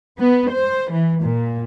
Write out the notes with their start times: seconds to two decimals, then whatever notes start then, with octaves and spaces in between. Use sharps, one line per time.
0.18 B3
0.52 C5
0.91 E3
1.23 A#2